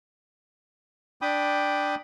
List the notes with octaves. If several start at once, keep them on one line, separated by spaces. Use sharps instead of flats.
D4 G5 B5 D6 D#6